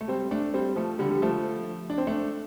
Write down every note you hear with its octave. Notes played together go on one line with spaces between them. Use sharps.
A3
G3 C4
A3 D4
G3 C4
F3 A3
D3 G3
G3
F3 A3
D4
C4
A3 D4